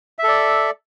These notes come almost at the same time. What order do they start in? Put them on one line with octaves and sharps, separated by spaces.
E5 A4 D5